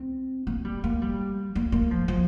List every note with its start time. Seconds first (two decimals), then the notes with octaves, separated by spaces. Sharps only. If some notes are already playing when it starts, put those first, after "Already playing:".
Already playing: C4
0.47 A#3
0.65 G3
0.84 A#3
1.02 G3
1.55 A#3
1.72 A#3
1.91 F3
2.08 F3